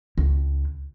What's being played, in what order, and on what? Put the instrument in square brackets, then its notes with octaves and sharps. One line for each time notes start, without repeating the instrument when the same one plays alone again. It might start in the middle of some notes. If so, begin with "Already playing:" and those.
[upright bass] C#2